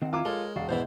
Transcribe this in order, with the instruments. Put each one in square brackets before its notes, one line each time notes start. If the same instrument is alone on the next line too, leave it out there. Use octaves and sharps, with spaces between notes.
[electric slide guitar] D#3 C4 [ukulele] D#5 F#5
[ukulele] E4 A#5 [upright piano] F4 D6
[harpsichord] G#3 [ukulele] A4 [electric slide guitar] A#4 C#5
[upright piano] E1 [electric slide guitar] F#4 [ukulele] D5 F5 F#5
[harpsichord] G#2 B2 E3 [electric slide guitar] E4 C5 [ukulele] B4 D5 E5